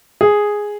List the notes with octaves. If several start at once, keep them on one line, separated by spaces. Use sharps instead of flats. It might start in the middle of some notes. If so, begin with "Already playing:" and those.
G#4